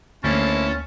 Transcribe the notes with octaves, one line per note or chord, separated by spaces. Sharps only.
D2 A#3 C4 C#4 E4 A5